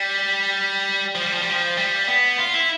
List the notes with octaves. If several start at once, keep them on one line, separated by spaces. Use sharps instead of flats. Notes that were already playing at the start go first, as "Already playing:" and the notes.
Already playing: G3
F3
G3
F3
G3
F3
G3
B3
F4
E4